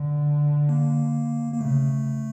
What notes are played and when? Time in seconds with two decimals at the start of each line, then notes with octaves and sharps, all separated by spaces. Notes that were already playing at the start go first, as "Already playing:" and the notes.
Already playing: D3
0.69 A#3
1.54 A#3
1.60 C#3 A3